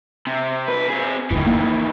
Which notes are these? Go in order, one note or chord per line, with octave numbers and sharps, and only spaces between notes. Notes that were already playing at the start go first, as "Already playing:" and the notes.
C3
C2 B4
C4 G#4
F#1 D2 D#3 E3
A#3